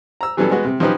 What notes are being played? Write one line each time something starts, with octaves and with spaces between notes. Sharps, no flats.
A#5 E6
E3 F#3 G3 B3 C#4 A4
G#3 B3 F#4
C3
F3 F#3 C#4 D#4 G4 B4